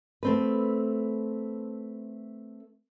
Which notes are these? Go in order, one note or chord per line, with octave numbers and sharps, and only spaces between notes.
A3 C4 B4